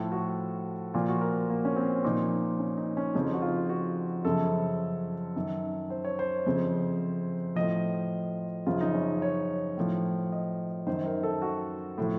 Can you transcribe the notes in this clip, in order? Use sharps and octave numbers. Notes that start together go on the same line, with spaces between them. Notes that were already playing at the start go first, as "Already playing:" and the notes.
Already playing: A2 F3 A4
F#4
A#2 F3 F4
F#4
A#4
A#3
C#4
C4
A#2 F3 D#4
C#4
D#4
C#4
F2 C#3 F3 D#4
F#4
F4
F#4
F#2 C#3 F3 A4
F#2 D#3
C5
C#5
C5
F2 C#3 F3
A2 F3 D#5
F#2 C#3 F3 F4
D#4
C#4
C#5
A2 F3
D#5
F#2 D#3 C5
A#4
A4
F#4
A2 F3